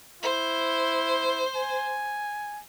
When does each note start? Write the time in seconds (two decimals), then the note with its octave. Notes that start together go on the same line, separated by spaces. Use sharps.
0.23 E4 C5
1.56 G#5